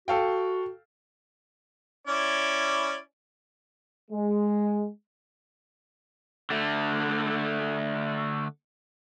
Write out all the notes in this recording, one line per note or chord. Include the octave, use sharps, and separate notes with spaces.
F#4 A4 F5 G5
C#4 E4 D5
G#3
D3 A3